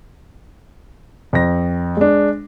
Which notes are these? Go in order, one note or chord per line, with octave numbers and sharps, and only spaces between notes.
F2 A#6
G#3 D4